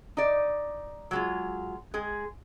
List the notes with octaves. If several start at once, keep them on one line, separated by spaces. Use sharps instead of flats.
D#4 D5
F#3 G#3 F4
G#3 G#4